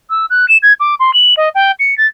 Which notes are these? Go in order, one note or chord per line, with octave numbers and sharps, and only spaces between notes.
E6
F#6
E7
G#6
D6
C6
F#7
D#5
G5
C#7
A6